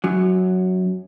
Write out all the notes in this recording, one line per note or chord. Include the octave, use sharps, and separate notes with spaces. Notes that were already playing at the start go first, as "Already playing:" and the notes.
F#2 F#3